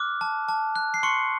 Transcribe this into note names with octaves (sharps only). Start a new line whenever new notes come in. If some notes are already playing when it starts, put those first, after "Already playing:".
Already playing: D6 F6 F#6
A5
A5
F#6
C7
C6 C#6 C#7